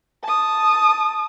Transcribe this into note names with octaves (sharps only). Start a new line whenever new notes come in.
A5 D#6